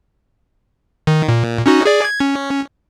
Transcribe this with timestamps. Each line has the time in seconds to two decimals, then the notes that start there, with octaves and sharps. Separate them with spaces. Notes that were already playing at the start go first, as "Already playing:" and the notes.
1.07 D#3
1.28 A#2
1.66 C#4 D#4 F#4
1.85 G#4 D5
2.05 G#6
2.20 C#4